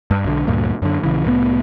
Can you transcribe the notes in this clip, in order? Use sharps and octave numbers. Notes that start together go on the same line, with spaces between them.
G2
B1 D3
D2 G2 A#2
F#2 D3
A#1 C#3 E3
C2 A2 F#3 B3